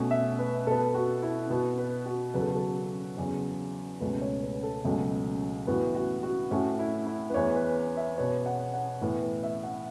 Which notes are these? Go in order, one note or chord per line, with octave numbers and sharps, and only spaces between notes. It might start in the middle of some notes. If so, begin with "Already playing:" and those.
Already playing: B2 A3 C#4
E5
B4
B2 B3 A4
F#4
E4
B2 B3 F#4
B4
F#4
E2 C#3 F#3 B4
A4
F#4
A4
E2 C#3 F#3 C#4
C#2 B2 A3 C#4 B4
C#5
B4
A4
C#2 B2 F#3 A3 C#4
A2 E3 B3 F#4
F#4
F#4
A2 A3 C#4 F#4
E4
E4
B4
E2 E3 B3 C#5
B4
E5
B2 B3 C#5
F#5
F#5
A2 E3 B3
B4
E5
F#5